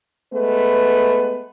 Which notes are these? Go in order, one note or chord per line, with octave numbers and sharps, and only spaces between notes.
G#3 A3 B3 B4